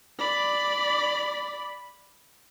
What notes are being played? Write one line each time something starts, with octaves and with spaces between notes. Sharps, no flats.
D5 B5